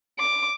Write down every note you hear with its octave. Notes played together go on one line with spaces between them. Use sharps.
D6